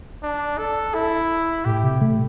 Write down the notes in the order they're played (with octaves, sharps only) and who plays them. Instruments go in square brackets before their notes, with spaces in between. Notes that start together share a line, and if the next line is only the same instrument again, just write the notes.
[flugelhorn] D4
A4
E4
[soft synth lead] A2 [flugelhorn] G4
[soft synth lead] C3
A3